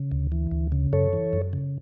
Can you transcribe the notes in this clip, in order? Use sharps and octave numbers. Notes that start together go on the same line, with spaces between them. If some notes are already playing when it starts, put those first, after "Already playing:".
Already playing: C#3
D2
E3
D2
C#3
F#2 A4 C#5
E3
F#2
C#3